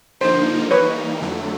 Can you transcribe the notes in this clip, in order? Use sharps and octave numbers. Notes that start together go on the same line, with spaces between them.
G2 D3 F3 A#3 D#4 C5
E3 G3 A#3 D#4 B4 C#5
F2 D3 F#3 A3